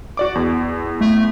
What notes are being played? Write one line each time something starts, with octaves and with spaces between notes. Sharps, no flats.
F#4 D5 D6
E2
A3